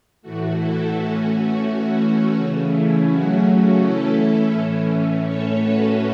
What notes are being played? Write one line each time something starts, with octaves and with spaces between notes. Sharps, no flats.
A2 E3 A3 F#4
E4 A4
E3 A3 C#4 F#4
E3 A3 C#4 F#4
C#3 E3 A3 C#4
E4
C#3 F#3 A3 C#4 F#4
E3 A3 C#4 E4 A4
E4 A4
A2 E3 A3 C#4
A2 A3 C#4 A4 C#5
F#4 B4